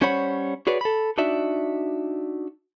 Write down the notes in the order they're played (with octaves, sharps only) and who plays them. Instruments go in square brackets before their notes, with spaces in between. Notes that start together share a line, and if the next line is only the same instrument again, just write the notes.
[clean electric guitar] G3 C#4 C5 C#5 F#5 B5
F#4 G#4 B4 C#5 D5
A4 B5
D4 D#4 F#4 D5 E5